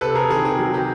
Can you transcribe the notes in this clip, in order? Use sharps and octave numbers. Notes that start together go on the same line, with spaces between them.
C3 A4 B4
C3 G#4 A#4
D#3 G#4
C3 G#4
F#3
C3 G4